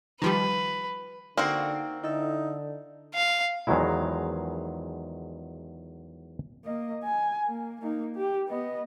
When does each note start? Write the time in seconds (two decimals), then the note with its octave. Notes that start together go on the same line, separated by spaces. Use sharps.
0.22 D#3 F3 G3 B4
1.37 D3 A#3 C4 D#4 F#4
2.04 D3 D#4 E4 A4 E5
3.14 F5
3.67 E2 D#3 F3 F#3 G#3 E4
6.65 A#3 D#5
7.04 G#5
7.48 A#3
7.82 A#3 D#4
8.16 G4
8.48 B3 D#5